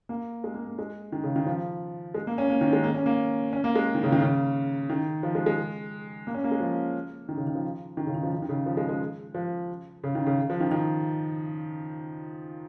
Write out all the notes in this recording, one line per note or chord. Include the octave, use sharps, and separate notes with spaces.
A#3
G#3
A#3
A#3
G#3
D#3
C#3
D#3
F3
G#3
A#3
C#4
A#3
D#3
G#3
A#3
C#4
A#3
C#4
A#3
G#3
D#3
C#3
D#3
C#3
D#3
F3
G#3
G#3
A#3
C#4
A#3
G#3
F3
D#3
C#3
D#3
F3
D#3
C#3
D#3
F3
D#3
D#3
C#3
F3
G#3
G#3
F3
C#3
D#3
C#3
F3
D#3
D#3